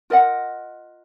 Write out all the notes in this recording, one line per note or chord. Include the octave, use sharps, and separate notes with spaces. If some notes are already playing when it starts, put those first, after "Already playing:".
F4 A#4 D#5 F#5